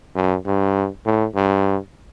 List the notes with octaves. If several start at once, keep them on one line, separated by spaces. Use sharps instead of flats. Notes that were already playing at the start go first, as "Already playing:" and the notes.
F#2
G2
A2
G2